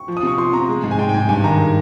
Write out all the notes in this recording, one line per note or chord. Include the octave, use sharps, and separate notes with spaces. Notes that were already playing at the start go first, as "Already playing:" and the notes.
Already playing: C#6
F3
D#6
C3 C#6
F3 C6
C3 A#5
G#3
G#2
G#5
G#2 G5
G5
G#2 G#5
G2 G#5
D#3 A#5